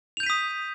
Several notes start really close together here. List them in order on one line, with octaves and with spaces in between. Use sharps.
F7 G6 D#7 B6 D#6